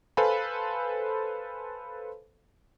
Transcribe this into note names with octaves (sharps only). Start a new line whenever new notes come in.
A4 B4 C5 F5 G#5 B5